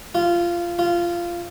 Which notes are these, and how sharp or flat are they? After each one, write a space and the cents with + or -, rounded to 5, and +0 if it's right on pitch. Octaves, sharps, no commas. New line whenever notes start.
F4 -15
F4 -15